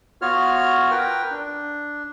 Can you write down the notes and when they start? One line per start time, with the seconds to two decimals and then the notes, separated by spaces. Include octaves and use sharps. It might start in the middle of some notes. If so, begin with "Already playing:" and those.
0.22 B3 F4 F#4 C#5 F6
0.91 A#4 B4 G5
1.31 D4